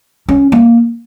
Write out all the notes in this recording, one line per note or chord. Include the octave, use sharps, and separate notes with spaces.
C#4
A#3